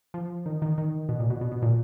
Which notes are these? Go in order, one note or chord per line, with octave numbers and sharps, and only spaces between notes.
F3
D#3
D#3
D#3
B2
A#2
B2
B2
B2
A#2